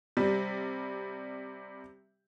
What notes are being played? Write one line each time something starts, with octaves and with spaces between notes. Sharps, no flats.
C3 G3